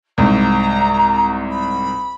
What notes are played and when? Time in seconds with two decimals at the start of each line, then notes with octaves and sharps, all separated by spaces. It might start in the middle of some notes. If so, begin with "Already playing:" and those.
0.18 C2 G#2 A#5
1.51 B5